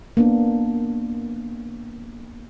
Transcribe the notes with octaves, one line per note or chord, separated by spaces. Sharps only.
A#3 B3 D4